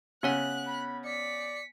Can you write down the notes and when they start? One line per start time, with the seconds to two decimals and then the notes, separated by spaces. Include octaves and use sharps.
0.23 C#3 B3 C#5 F#5 F#6
0.67 B5
1.05 D5 B6 C#7